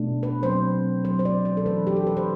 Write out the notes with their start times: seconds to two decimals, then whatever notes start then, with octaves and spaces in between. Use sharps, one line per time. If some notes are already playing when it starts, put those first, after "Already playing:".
Already playing: B2 A3 D4
0.23 B4
0.43 F#3 C4 C5
1.04 F#3 A3 C4 C5
1.19 C5
1.25 D5
1.45 C5
1.57 A4
1.66 E3 A3 D4 B4
1.87 G4
1.96 A4
2.07 B4
2.17 C5